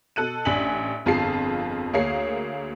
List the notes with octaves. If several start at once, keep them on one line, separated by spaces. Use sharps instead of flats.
B2 A4 F#6 D#7
A1 D4 G#5 B6 F#7
G1 F2 F4 G#4 A5 C7
D2 A#3 G#4 C#5 F5 C7